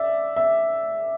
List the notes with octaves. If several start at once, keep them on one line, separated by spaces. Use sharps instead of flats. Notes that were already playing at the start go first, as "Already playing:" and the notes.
Already playing: D5 E5
E5